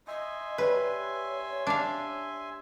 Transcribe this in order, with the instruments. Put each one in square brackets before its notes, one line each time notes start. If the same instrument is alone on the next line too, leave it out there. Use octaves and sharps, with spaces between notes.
[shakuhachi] D#5 [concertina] E5 G#5 C6
[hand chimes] G4 D5 [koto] B4 [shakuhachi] C#5
[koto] D4 F5